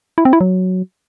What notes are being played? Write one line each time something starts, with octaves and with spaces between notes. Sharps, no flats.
E4
C4
E4
F#3